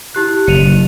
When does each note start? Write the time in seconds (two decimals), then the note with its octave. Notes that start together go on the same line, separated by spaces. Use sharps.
0.15 E4 G4 F#6
0.48 F#1 C#7 D#7 F7